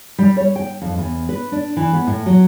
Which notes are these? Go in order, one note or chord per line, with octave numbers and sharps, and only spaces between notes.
G3
C#5
G5
F2
E2
B4
D4
E3
B3
A2
F#3